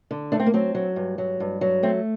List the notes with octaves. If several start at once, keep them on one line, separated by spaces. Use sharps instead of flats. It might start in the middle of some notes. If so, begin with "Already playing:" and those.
D3
A3 D4
C4
A#3
F#3 C4
F#3
G2
F#3
G2
F#3
A3 C4